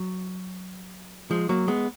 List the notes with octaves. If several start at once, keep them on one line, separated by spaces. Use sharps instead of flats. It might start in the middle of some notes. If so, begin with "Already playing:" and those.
Already playing: F#3
F3 G#3
F#3 A#3
G#3 B3